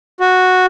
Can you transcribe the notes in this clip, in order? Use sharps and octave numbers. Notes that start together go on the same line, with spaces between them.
F#4